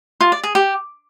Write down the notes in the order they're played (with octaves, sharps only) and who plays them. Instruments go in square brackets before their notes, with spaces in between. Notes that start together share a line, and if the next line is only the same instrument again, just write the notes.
[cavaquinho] F4
D5
G#4
G4